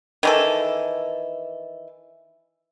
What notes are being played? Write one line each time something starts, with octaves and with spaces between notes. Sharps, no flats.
D#3 E3 A4